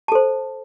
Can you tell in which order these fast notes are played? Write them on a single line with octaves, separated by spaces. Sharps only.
A5 A4 C5